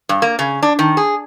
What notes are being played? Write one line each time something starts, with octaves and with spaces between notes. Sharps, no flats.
G2
A#3
C#3
D4
D#3
G#4